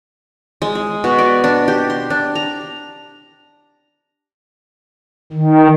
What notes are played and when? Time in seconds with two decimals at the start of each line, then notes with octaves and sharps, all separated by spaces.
0.62 G#3
0.75 G#4
1.04 B2
1.19 D5
1.44 D4
1.68 G4
1.90 C6
2.10 D4
2.35 A#5
5.32 D#3